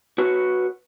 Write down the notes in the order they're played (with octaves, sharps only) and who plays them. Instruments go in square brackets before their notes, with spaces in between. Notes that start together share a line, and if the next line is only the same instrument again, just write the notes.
[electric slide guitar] F#4 B4 C#5